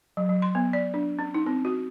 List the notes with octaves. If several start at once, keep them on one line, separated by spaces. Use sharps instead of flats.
F#3
F#3
C6
B3
D5
D4
C#4
D#4
C4
F#4